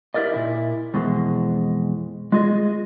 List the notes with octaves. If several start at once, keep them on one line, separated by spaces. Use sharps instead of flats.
E4 G4 A#4 D5 D#5
A#2 E4
F2 B2 E3 G#3
G#3 F4 G#4 D#5